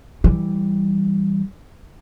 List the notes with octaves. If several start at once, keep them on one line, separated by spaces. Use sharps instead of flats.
E3 G3